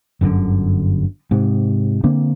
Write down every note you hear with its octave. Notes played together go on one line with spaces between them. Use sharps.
G1 F#2 A#2 D3
G#2 C3
D3 A#3 C4 D4